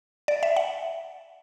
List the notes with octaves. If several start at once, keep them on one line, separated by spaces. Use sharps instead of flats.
D5
E5
F#5